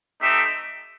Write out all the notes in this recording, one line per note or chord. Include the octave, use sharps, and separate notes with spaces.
A3 C4 D#4 G4 E5